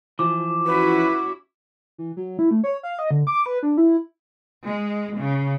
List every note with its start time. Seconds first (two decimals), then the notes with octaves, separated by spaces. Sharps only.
0.19 E3 F3 D6
0.66 C#4 E4 F#4 B4
1.98 E3
2.17 F#3
2.39 E4
2.51 A3
2.64 C#5
2.83 F5
2.99 D#5
3.11 D3
3.27 D6
3.46 B4
3.63 D4
3.77 E4
4.67 G#3
5.17 C#3